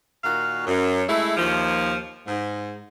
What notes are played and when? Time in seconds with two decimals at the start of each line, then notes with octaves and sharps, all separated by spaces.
0.24 A#2 D#3 F#4 F5
0.67 F#2
1.08 G#3 A3 E4
1.37 D#2 F3
2.27 G#2